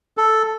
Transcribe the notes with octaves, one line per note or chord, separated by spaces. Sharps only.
A4